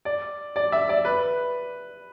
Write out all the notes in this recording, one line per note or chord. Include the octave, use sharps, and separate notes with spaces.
D5
D5
E5
D5
B4